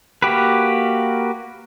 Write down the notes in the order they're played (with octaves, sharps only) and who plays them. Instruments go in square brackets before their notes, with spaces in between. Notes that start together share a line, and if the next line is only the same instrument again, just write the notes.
[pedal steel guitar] A#3 F#4 G4 B4